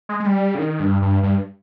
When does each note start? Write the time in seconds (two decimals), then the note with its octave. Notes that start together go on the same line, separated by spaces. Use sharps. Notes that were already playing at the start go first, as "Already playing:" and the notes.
0.09 G#3
0.20 G#3
0.26 G3
0.55 C#3
0.59 D#3
0.80 G2
1.02 G2
1.23 G2